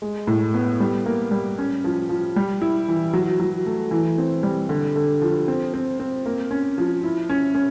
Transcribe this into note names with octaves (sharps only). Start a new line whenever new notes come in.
G#3
A2
B3
G3
A#3
G3
C#4
F3
F3
G3
E4
E3
F#3
F#3
A3
E3
C4
G3
D3
D3
F3
C4
C4
C4
A#3
C#4
F3
E4
C#4
C#4